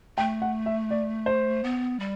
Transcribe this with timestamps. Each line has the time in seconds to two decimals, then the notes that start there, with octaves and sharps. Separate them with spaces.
0.18 A3 G5
0.42 F#5
0.66 E5
0.91 D5
1.26 C5
1.64 B3
2.00 G3